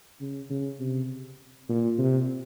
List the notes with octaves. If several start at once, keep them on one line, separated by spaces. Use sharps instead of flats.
C#3
C#3
C3
A#2
C3